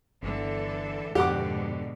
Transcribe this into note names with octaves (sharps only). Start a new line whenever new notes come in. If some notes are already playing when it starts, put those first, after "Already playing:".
G1 D3 E3 A4
F2 G#2 B2 D3 G4 F#5 D6